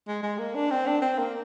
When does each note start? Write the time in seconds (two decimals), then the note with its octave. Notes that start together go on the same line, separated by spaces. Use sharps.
0.08 G#3
0.23 G#3
0.38 A#3
0.55 D4
0.70 C4
0.86 D4
1.02 C4
1.19 A#3